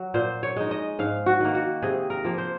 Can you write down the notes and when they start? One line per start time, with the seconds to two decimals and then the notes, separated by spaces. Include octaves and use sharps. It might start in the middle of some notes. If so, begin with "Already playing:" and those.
Already playing: F#3
0.14 A#2 C5
0.43 C#5
0.57 G#3 D#4
0.71 D#5
0.99 G#2 F5
1.26 F#4
1.40 D#3 A#3
1.55 F#4
1.82 C3 G#4
2.10 A#4
2.25 F3 A#3
2.38 C5